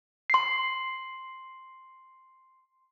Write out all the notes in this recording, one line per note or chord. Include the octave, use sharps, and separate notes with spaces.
C6 C7